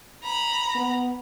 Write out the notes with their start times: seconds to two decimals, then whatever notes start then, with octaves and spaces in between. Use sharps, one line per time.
0.24 A#5 B5
0.75 B3